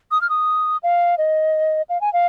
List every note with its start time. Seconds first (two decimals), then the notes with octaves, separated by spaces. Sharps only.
0.11 D#6
0.21 F6
0.29 D#6
0.83 F5
1.18 D#5
1.89 F5
2.01 G#5
2.13 F5